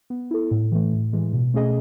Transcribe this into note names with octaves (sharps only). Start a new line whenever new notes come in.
B3
E4 A4
A2
E3 A3
A2
E3 G#3
B2
A3 C#4 G#4 D#5